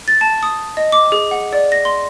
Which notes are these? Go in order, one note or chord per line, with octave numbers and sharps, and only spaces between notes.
A6
A5
D#6
D#5
D6
G#4
F#5
D5
A#6
C6